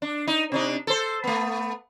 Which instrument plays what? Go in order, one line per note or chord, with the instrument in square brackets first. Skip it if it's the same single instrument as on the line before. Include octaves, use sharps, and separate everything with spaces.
[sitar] D4
D#4
C3 D4 D#4
A4 C5
A3 B3